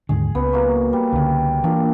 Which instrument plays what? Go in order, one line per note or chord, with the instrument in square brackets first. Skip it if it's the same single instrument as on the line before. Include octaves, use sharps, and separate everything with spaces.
[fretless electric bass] D#2 G#2 D3 [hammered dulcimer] G#4
[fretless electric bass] C#2 [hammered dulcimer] B3
[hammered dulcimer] F#3 A#3
G3
[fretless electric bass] C#2 D3
[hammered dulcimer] A#2 D4 [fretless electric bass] E3